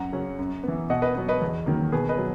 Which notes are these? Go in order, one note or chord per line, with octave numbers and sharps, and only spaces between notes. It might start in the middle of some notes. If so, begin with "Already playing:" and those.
Already playing: F#2 F#5 A#5
C#3 F#3 C#4
F#2
E3 B3
B2 D#5 F#5
B4 D#5
F#3 B3
B4 D#5
E2
D#3 F#3 A#3
B2 G#4 B4
B4 D#5
F#3